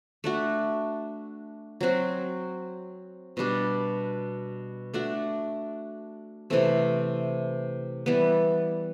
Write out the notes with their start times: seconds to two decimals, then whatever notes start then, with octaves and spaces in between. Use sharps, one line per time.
0.24 A3 D4 F#4
1.81 F#3 C4 F#4
3.37 B2 G3 D4
4.94 A3 D4 F#4
6.50 C3 E3 A3 C4
8.06 E3 G3 B3